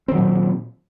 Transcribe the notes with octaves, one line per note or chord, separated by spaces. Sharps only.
A#2 D#3 F#3 C4